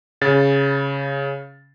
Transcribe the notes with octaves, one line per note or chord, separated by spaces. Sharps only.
C#3 A6